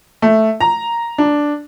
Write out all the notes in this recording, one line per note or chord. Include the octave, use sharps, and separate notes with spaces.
A3
A#5
D4